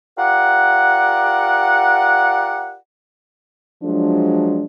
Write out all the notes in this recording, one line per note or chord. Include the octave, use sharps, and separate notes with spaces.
F4 G4 A#4 D5 F#5
F3 F#3 G#3 D4